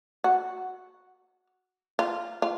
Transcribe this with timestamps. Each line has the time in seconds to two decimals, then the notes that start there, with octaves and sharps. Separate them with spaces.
0.24 F#4
1.99 F4
2.42 F4